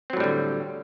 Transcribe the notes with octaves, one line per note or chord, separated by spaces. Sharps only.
A2 D3 F#3 G3 C4